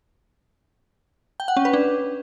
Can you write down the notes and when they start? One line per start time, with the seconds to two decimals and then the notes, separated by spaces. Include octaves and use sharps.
1.40 G5
1.48 F#5
1.57 C#4
1.65 B4
1.74 D4